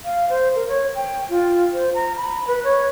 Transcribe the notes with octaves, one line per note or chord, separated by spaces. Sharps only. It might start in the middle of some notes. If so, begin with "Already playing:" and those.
F5
C5
A#4
C#5
G5
F4
C5
A#5
B5
B4
C#5